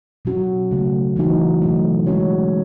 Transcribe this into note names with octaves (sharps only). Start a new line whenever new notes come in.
B2 F#3 C#4 F#4
C#3 F#3 A3
E3 A3 D#4 F#4
B2 F#3 A3
G#3 C#4 F#4 C#5